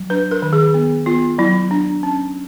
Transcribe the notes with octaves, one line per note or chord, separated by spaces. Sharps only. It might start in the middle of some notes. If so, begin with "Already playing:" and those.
Already playing: F#3
D4 B4
A#4
D#3
G#4
B3
B3 F4
F#3 E4
D4
C#4